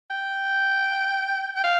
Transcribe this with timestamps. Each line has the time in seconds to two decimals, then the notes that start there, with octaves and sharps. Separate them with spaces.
0.10 G5
1.56 G5
1.64 F5